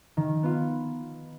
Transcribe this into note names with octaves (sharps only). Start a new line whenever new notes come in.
D#3
B3 F4